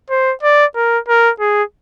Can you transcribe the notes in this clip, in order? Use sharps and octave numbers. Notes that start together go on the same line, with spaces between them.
C5
D5
A#4
A#4
G#4